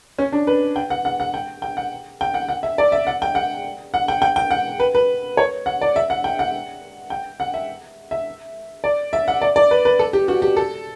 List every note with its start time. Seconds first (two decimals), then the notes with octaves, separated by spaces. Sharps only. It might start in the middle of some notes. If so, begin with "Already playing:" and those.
0.18 C#4
0.32 D4
0.47 B4
0.76 G5
0.90 F#5
1.05 F#5
1.20 F#5
1.34 G5
1.62 G5
1.77 F#5
2.21 G5
2.34 F#5
2.49 F#5
2.63 E5
2.78 D5
2.92 E5
3.07 F#5
3.22 G5
3.35 F#5
3.94 F#5
4.08 G5
4.22 G5
4.36 G5
4.51 F#5
4.80 B4
4.95 B4
5.37 C#5
5.66 F#5
5.81 D5
5.96 E5
6.10 F#5
6.24 G5
6.39 F#5
7.10 G5
7.40 F#5
7.54 E5
8.11 E5
8.84 D5
9.13 E5
9.28 F#5
9.41 D5
9.56 D5
9.71 B4
9.85 B4
9.99 A4
10.13 G4
10.28 F#4
10.42 G4
10.57 A4